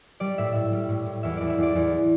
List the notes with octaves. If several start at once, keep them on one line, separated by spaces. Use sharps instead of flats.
G3 D5
A2 E5
A2 E5
G3
A2
A2
E2 E5
E2 D5
E5
E2 D5
E2